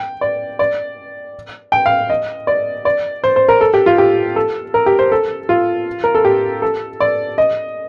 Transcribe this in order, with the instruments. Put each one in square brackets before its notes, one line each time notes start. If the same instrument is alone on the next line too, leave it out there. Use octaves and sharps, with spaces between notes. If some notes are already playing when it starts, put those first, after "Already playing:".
Already playing: [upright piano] G5
D5
D5
G5
F5
D#5
D5
D5
C5
C5
A#4
A4
G4
F4
G4
A4
A#4
G4
C5
A4
F4
A#4
A4
G4
A4
D5
D#5